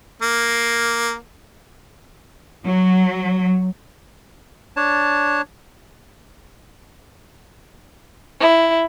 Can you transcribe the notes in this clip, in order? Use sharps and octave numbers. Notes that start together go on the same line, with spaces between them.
A#3
F#3
D4 C#5 A5
E4